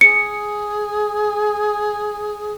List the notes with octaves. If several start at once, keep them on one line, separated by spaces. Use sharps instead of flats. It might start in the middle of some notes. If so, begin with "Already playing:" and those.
G#4 C#7